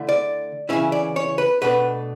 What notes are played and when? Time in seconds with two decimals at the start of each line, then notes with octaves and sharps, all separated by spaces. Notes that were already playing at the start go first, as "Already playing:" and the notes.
Already playing: D3 A3 E4
0.09 D5
0.69 C#3 E3 A3 C#4 E4 E5
0.92 D5
1.16 C#5
1.38 B4
1.62 B2 A3 D4 B4